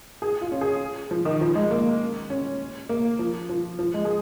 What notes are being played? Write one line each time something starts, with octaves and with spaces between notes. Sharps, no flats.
G#4
F4
C#4
G#4
F3
D#3
F3
G#3
A#3
C#4
A#3
F3
F3
F3
G#3
G#4